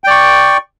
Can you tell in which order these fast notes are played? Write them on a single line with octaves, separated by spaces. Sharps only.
G5 D5 C#6